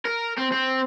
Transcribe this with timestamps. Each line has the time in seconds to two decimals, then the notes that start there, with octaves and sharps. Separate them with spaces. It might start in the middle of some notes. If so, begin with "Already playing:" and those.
0.05 A#4
0.38 C4
0.52 C4